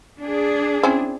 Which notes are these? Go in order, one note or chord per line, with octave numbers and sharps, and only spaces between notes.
D4 G#4
C4 C#4 E4